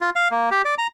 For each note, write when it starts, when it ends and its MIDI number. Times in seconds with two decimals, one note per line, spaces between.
0.01 0.10 65
0.16 0.28 77
0.31 0.50 58
0.51 0.62 67
0.65 0.75 74
0.78 0.87 82